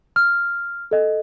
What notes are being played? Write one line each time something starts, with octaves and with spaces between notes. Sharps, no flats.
F6
A4 D#5